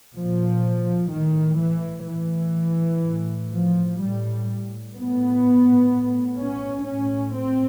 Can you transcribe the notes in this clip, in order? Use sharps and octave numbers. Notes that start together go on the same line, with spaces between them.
A#2 F3
A2 D#3
E3
A2 E3
A2
F3
A2 G3
A2 B3
A2
C#4
A2 C#4
C4